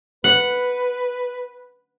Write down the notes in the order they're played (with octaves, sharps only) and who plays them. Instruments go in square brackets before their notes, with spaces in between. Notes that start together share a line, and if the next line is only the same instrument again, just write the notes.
[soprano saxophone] B4 [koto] F#5